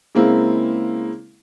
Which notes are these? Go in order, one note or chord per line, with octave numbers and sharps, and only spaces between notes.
C#3 G#3 A#3 C4 E4